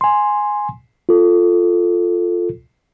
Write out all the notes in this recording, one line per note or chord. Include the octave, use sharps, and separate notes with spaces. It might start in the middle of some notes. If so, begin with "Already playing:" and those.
G#5 C6
F4 A4